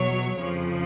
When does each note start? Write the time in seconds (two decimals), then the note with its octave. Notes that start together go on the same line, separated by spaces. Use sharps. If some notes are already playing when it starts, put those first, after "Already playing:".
Already playing: E2 B2 F#3 C#5
0.38 F2 C#3 F3